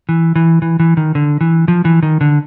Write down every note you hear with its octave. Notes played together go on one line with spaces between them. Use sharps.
E3
E3
E3
E3
D#3
D3
E3
F3
E3
D#3
D3